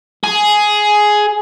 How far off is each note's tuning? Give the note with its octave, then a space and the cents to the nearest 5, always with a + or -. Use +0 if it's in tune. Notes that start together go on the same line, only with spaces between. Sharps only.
G#4 +10